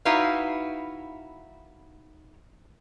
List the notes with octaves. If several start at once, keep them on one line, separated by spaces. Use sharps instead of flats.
D#4 E4 F#4 B4 E5 F5